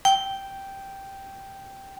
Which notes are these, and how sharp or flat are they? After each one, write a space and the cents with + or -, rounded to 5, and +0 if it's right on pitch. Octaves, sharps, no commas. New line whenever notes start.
G5 -5